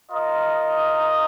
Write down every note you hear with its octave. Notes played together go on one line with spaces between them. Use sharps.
F4 A#4 D#5